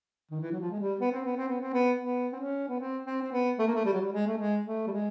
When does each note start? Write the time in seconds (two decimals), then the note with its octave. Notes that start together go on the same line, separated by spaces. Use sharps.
0.31 D#3
0.40 E3
0.52 F#3
0.60 F3
0.71 G#3
0.80 G3
1.00 B3
1.12 C4
1.24 B3
1.36 C4
1.48 B3
1.61 C4
1.73 B3
1.99 B3
2.32 C4
2.39 C#4
2.68 B3
2.79 C4
3.06 C4
3.21 C4
3.32 B3
3.59 A3
3.67 A#3
3.75 A3
3.85 G3
3.93 F#3
4.01 G3
4.12 G#3
4.27 A3
4.38 G#3
4.65 A3
4.87 G3
4.92 G#3